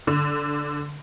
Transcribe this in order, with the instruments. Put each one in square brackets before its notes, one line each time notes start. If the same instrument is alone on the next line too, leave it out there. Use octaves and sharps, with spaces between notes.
[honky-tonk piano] D3